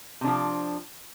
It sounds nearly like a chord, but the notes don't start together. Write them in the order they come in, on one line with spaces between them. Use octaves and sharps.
C3 D4 F3